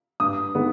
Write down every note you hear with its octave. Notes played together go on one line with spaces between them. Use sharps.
G2 D#6
D#3 G#3 B3